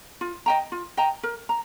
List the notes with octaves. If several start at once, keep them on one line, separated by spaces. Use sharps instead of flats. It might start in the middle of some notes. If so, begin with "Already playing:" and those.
F4
D#5 G5 A#5
F4
D#5 G5 A#5
A#4
A#5